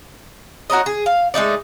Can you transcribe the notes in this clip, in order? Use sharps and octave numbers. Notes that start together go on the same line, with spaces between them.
F#4 A#4 C#5 D#5
G#4
F5
G#3 A3 D#4 D5